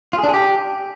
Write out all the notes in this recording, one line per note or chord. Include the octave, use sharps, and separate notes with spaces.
F4
G#4
D4
G#4
G4